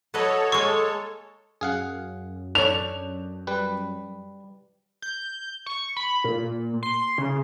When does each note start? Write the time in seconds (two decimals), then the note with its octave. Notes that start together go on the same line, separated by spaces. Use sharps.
0.14 F#3 A4 B4 C#5 D#5
0.52 G#3 A#3 C#6
1.61 F#2 G#4 F5 F#5
2.55 D4 A4 C#5 F7
3.47 G3 B4
5.02 G6
5.66 C#6
5.97 B5
6.24 A#2
6.83 C6
7.18 C#3